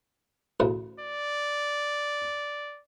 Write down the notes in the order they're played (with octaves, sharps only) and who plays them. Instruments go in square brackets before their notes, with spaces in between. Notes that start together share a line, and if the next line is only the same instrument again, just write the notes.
[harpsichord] A1 D2 C#3
[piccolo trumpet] D5